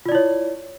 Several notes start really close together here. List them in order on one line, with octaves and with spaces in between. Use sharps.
F4 D5 E4 C#5